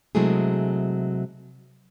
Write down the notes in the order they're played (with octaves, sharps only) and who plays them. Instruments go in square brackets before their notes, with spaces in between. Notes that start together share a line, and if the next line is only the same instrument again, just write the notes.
[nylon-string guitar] C3 F#3 G#3 A3 E4 G#4